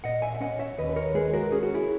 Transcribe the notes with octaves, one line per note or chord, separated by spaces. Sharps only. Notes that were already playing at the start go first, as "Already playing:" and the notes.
A#2 D#5 F#5
E5 G#5
E5
C#4 D#5 F#5
C#5 E5
D#2 B4 D#5
B4
A#4 C#5
G#3 G#4 B4
F#4 A#4
C#4 G#4
F#4
E4 G#4